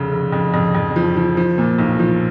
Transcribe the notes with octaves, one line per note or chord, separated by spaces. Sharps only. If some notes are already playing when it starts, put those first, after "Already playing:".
Already playing: F1 C#3
F1
F2
F2
F2
F3
F3
F3
A#2
B1
F3